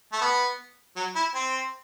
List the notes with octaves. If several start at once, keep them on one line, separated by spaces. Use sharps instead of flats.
A3
B3
F#3
E4
C4